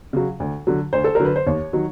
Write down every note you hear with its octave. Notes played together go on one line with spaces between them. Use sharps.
C#3 F#3
D2
D3 F#3
D2 C5
A4
D3 F#3 A#4
B4
C5
D#2 C#5
D#3 F#3